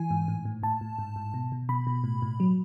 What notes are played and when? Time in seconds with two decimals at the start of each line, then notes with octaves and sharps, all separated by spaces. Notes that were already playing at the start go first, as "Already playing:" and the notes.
Already playing: E3 G#5
0.11 G#2
0.28 A2
0.45 A2
0.63 A2 A5
0.81 A2
0.98 G#2
1.16 G#2
1.34 B2
1.52 B2
1.69 B2 B5
1.87 B2
2.04 A2
2.22 A2
2.40 F#3